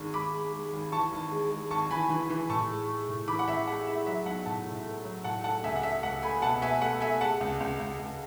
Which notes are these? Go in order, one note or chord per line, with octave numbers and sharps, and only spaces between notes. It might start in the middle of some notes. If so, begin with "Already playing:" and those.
Already playing: G#1 G#2 G#3 C#6
G#1 B5 D6
G#3
G#3
G#1
E3 A5 C#6
G#1
G#3
G#3
G#1 A5 C#6
E3 G#5 B5
E3
E3
A2 A5 C#6
G#3
G#3
A2
E3 B5 D6
F#5
A1 E5
G#3 F#5
G#3 E5
F#3 E5
B1 F#5
A2 F#5 A5
A2
A3
F#3
A2 F#5 A5
A3 F#5 A5
C#2 E5 G#5
F#5
A3 E5
C#2 F#5
A3 G#5 B5
B2 F#5 A5
B2 E5 G#5
A3 F#5
A3 E5 G#5
G#3 F#5 A5
C#2
C#2
C#2
C#2